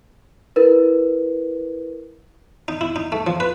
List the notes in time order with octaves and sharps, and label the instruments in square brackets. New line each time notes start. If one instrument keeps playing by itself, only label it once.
[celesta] E4 A#4 B4
[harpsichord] D#4
E4
D#4
A3
F3
B4